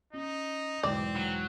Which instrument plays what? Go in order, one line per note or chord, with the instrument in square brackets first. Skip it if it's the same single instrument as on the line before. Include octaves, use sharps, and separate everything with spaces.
[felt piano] C#4 [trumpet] D#4
[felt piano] B1 E2 G#2 [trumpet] C4 [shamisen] D5
[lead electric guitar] F#3